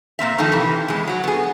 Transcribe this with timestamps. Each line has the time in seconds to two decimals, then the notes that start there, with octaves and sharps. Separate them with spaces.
0.19 A#2 A#3 C4 E5
0.38 D#3 F3 A#3 D#4 A4
0.52 C3 E3
0.88 E2 G#3
1.07 F#3 F#4
1.23 B3 G#4